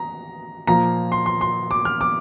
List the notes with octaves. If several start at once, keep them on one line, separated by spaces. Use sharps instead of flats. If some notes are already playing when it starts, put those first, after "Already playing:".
Already playing: A#5
A#2 F3 A#3 F4 A#5
C6
C6
C6
D6
F6
D6